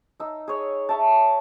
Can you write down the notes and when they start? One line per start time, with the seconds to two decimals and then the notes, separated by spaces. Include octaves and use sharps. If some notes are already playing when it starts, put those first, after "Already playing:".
0.20 D#4 E6
0.48 G#4 C#5
0.89 C#5 E5 A5